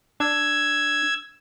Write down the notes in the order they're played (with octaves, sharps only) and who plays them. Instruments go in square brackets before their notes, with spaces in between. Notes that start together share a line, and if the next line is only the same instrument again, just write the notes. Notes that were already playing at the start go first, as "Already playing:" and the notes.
[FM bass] D4 [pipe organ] E6 G#6